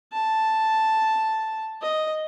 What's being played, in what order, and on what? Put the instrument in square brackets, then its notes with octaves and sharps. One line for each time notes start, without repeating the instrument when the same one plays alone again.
[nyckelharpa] A5
D#5